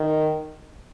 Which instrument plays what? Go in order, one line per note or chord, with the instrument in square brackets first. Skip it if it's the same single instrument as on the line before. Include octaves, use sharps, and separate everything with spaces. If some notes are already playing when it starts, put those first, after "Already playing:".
Already playing: [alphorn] D#3